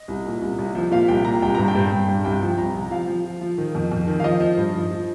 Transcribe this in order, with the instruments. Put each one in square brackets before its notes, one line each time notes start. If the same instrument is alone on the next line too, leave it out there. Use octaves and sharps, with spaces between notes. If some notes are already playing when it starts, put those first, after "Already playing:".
Already playing: [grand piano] D#5
C2
A#2
C2
C2
F3
A#2 F5
C2 G5
A#2 A#5
C2 G5
G2 A#5
G5
G2
G2
G2
C2 G5
F3
C2 A#5
C2
F3 F5
F3
F3
F3
D#3
F2
F2
D#3
F5
F3 D#5
F3
G2
F3
F3